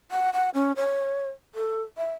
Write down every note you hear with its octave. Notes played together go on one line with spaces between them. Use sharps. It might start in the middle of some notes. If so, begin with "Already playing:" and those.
F#5
F#5
C#4
C#5
A4
E5